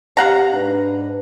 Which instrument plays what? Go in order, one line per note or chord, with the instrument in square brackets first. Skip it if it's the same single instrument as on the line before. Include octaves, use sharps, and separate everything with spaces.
[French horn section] C3 G4 [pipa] F5 F#5 A#5
[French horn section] G#2 D4 B4